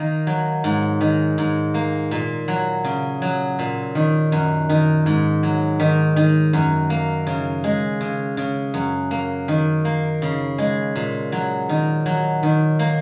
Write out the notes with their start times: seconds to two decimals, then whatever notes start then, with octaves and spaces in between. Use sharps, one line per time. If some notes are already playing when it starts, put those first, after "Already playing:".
Already playing: D#3 A#3
0.27 F#3
0.64 G#2
1.01 D#3
1.38 G#2
1.74 A#3
2.11 A#2
2.48 F#3
2.84 C#3
3.22 F#3
3.59 A#2
3.95 D#3
4.32 F#2
4.69 D#3
5.06 G#2
5.43 F#3
5.80 D#3
6.16 D#3
6.53 F#2
6.90 A#3
7.27 C#3
7.64 G#3
8.01 C#3
8.37 C#3
8.74 F#2
9.11 A#3
9.48 D#3
9.85 A#3
10.22 C#3
10.58 G#3
10.96 A#2
11.32 F#3
11.69 D#3
12.06 F#3
12.43 D#3
12.79 A#3